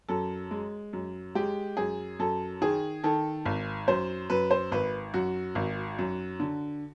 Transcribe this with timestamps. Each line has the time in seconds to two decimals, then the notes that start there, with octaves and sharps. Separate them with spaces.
0.09 F#2 A4
0.51 G#3
0.93 F#2
1.35 G#3 G4
1.77 F#2 G#4
2.19 F#2 A4
2.61 D#3 G#4
3.04 D#3 A4
3.46 G#1
3.88 F#2 C5
4.30 F#2 B4
4.51 C5
4.72 G#1 B4
5.14 F#2 F#4
5.55 G#1
5.99 F#2
6.40 D3